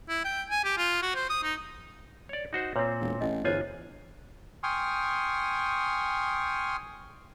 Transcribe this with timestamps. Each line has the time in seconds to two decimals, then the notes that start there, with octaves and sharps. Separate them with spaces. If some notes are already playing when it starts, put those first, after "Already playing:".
0.09 E4
0.25 G5
0.50 G#5
0.64 G4
0.78 F4
1.02 F#4
1.15 C5
1.30 D#6
1.43 D#4
2.29 C#5 D5
2.53 D#4 F#4 C5
2.76 A#2 C4 B4 C#5
3.01 E1
3.21 A1 D#5
3.44 G1 E2 F4 C5 C#5 G#5
4.63 G5 G#5 C6 C#6 D#6 F6